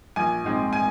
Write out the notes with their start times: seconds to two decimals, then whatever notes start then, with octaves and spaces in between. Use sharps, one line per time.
0.16 A#1 G#5
0.44 G#2 G#3 C4
0.73 G#5